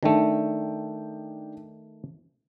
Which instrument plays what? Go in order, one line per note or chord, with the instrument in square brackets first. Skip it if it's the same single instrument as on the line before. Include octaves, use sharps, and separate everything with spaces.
[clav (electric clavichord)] D#3 A3 [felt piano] D4 D#4 G5